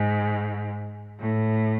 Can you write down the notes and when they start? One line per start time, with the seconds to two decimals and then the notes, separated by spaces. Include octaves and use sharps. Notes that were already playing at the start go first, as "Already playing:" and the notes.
Already playing: G#2
1.19 A2